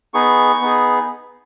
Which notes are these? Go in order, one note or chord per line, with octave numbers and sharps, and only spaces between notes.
B3 D#4 G#4 C#6
B3 D#4 G#4